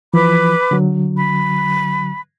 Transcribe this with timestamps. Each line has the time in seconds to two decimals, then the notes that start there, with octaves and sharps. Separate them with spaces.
0.14 E3 F3 B4 B5 D6
0.71 D3 F#3
1.16 B5